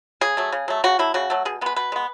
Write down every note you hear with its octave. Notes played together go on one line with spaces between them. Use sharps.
C#3 G#4
F#3 A3
C#3
F#3 A3
C#3 F#4
F#3 A3 E4
C#3 F#4
F#3 A3
B2 G#4
G#3 B3 B4
B2 B4
G#3 B3